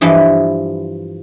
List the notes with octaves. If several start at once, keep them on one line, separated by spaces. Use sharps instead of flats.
G2 E3 F3 D#5